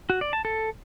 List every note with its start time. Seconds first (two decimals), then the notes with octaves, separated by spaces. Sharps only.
0.10 F#4
0.21 D5
0.33 A5
0.45 A4